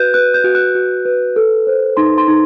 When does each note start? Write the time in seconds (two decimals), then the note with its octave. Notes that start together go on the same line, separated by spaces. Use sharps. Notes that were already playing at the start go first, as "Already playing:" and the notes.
Already playing: F#4 B4 F#6 G6
0.14 B4 F#6
0.34 G6
0.44 F#4
0.55 F#6
0.75 F#4
1.05 B4
1.36 A4
1.67 C5
1.97 D#4 C6
2.18 C6
2.28 D#4